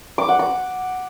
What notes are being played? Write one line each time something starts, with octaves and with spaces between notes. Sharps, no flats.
D6
F#5
D6